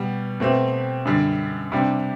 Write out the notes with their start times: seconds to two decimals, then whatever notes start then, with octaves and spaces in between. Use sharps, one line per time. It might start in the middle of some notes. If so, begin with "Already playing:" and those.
Already playing: B2 G3 B3
0.40 B2 A3 C4 G4
1.05 F#2 D3 G3
1.72 C3 G3 D4 G4